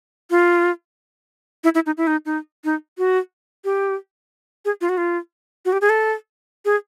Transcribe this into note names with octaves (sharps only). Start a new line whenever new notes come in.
F4
E4
E4
D#4
E4
D#4
D#4
D#4
F#4
G4
G#4
F4
F#4
F4
F#4
G4
G#4
A4
G#4